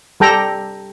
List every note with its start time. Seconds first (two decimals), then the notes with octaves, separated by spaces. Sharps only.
0.20 G3 A4 G5 A#5